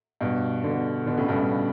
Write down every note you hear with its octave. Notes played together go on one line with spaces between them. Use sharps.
G2 B2
B2 D3
B2 D3
A2 C#3
G2 B2
G2